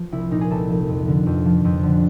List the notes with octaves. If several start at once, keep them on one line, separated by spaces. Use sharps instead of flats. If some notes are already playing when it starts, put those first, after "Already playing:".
Already playing: F3
C2 E4
A#2 D#4
G#4
C2 A4
F3
F2
D3
F2
F3
F2
D3